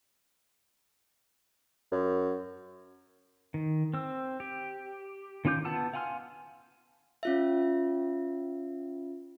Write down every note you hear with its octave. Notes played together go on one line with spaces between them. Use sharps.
F#2
D#3
C4 E6
G4
D#3 C#4 F4 D6 G6
B3 F4 F#5 A5 E6
F5 F#5 G#5 C6 F6
C#4 F4 E5